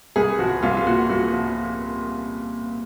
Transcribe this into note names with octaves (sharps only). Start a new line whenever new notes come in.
C2 G#4
F3 F#4
C2 F4
F4
A#2 F#4
C2 F#4
F3